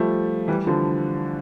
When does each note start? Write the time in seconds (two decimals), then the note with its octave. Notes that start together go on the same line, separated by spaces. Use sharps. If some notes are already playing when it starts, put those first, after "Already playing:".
Already playing: F3 G3 A3
0.48 E3 G3
0.67 D3 F3